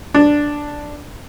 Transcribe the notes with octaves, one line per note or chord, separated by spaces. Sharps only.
D4